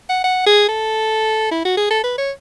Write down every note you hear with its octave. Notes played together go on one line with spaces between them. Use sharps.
F#5
F#5
G#4
A4
E4
F#4
G#4
A4
B4
C#5